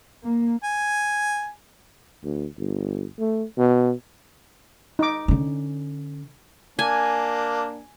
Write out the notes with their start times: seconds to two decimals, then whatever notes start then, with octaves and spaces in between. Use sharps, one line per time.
0.24 A#3
0.63 G#5
2.23 D2
2.58 G1
3.19 A3
3.58 B2
4.99 D#4 D6
5.28 D3 C#4
6.79 A#3 D4 G#5